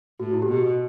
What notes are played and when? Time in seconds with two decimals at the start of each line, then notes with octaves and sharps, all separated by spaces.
0.20 A2 F#4
0.33 E4
0.42 G4
0.48 B2 F#4